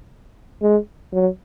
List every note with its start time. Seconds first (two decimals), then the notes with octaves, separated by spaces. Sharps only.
0.62 G#3
1.13 F#3